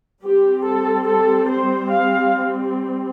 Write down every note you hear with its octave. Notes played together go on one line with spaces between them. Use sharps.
G3 C4 G4
A4
A4
C5
F5